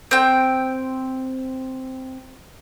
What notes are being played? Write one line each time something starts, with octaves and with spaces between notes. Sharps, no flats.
C4 G5